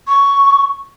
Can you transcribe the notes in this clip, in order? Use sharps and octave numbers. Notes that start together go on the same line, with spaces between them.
C#6